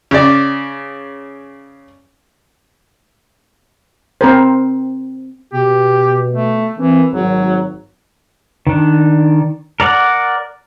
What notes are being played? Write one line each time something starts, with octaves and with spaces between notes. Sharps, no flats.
C#3 D5
C4 A#4 C5
B2 G4
A3
E3 C4 A#4
G#1 F#3
D#3 D4
A#4 D5 F#5